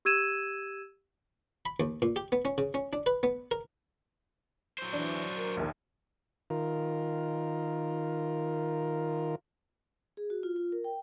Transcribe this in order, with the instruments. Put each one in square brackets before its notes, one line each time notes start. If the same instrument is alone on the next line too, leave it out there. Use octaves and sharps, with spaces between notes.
[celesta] G4 E6 G#6 D#7 E7
[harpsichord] B5
D#2
A#2
G4
B3
C#4
C#3
C#4
D4
B4
B3
A#4
[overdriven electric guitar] F#3 C5
[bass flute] E3 [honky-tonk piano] D4
[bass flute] A#4
[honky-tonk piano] A#1 D#2
[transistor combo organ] D#3 F4 A#4
[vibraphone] G#4
F#4
F4
F4
A#4
G5